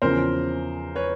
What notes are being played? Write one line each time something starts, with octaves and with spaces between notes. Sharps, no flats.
E2 C#3 F3 A#4 C5
B4 C#5